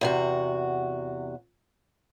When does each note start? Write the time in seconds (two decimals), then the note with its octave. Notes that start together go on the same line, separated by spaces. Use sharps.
0.01 E2 C3 F#4